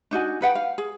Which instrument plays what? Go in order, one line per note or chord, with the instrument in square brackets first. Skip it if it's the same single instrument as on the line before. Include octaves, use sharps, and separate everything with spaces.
[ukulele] D4 D#4 F#4 G#5
D#4 B4 F#5 G5
F5
G#4